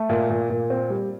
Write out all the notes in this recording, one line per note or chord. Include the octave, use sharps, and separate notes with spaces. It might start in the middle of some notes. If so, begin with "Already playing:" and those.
Already playing: A3
A#2
A#2
A#2
C4
G3